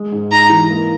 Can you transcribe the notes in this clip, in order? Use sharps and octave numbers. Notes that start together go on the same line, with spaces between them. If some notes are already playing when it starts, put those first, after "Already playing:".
Already playing: G#3
G#2
D#4 A#5
E3
A#3